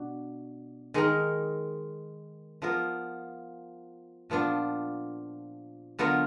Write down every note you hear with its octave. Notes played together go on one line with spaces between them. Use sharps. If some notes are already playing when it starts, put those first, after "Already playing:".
Already playing: B2 D4 F#4
D#3 G#3 D#4 A#4
F3 B3 F4 A#4
A#2 F3 B3 D4 F4
D3 F#3 B3 F4 A#4